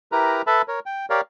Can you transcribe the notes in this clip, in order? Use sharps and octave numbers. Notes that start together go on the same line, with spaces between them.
E4 G4 A#4 B4 A#5
A4 B4 E5 A5 B5
A#4 C#5
G5
G4 A#4 C#5 D5 F5